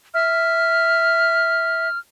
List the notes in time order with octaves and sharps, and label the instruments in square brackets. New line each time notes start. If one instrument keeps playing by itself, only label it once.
[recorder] E5 [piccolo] F6